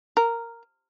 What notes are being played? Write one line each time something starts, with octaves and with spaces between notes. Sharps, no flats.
A#4